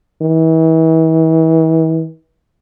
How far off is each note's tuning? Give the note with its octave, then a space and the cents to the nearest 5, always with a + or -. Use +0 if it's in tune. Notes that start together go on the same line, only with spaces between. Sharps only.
E3 -35